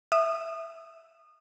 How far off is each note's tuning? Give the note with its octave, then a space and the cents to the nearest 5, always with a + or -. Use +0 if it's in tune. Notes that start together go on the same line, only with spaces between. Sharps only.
E5 +0 D#6 -25